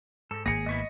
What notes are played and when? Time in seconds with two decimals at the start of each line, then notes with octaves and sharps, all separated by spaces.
0.31 G#2 A4
0.46 G#1 A#3 G#4 A#6 C#7
0.66 G#2 B3 E4 D#5 C#6